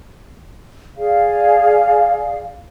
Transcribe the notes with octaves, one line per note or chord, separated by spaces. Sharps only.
G#4 D5 F5